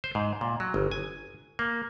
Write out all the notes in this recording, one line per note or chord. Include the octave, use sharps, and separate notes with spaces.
C5
G#2
A#2
F#3
G1
G#5
A#3